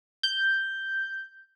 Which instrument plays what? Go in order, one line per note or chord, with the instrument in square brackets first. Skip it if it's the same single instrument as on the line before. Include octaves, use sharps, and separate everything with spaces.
[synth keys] G6